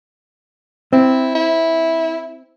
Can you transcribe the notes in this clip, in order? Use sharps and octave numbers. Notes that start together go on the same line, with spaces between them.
C4 E4
E4